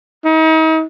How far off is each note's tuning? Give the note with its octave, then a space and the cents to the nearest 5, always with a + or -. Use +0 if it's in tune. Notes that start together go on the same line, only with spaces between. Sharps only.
D#4 +40